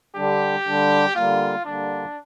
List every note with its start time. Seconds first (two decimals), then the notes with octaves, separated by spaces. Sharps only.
0.16 D3 G3 D4 G4
0.66 D3 G3 D4
1.15 D3 G3 A#3 F4
1.65 D3 G3 A#3 D4